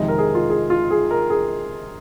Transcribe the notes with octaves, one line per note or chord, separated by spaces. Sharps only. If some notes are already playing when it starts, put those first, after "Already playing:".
Already playing: F2 C3 D#3 G#3 D#5
A#4
G#4
F4
G#4
F4
G#4
A#4
G#4